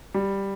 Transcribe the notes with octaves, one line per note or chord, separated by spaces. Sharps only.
G3